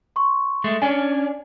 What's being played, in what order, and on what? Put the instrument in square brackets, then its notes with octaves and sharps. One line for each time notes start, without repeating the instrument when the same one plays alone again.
[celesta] C6 C#6
[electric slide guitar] G#3 A3
[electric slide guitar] C#4 D4 [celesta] G#5